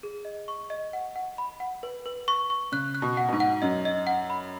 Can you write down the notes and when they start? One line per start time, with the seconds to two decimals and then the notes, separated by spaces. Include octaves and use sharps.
0.03 G#4
0.25 D#5
0.48 C#6
0.70 D#5
0.93 F#5
1.16 F#5
1.38 B5
1.60 F#5
1.83 B4
2.06 B4
2.28 C#6
2.50 C#6
2.72 C#3 F#6
2.95 F#6
3.02 B2
3.17 F#5
3.28 B2
3.32 G#2
3.40 F#5
3.62 F#2 D#5
3.85 D#5
4.07 F#5
4.30 B5